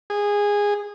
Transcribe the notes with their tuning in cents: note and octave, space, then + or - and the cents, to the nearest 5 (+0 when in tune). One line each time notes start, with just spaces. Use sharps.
G#4 -15